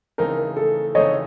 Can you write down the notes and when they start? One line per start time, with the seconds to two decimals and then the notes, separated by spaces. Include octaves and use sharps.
0.18 C#3 E3 A3 C4 D#4 A#4
0.57 A4
0.95 C#3 E3 A3 C4 D#4 C#5 D#5